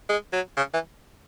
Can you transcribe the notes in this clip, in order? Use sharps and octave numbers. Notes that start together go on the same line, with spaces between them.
G#3
F#3
C#3
E3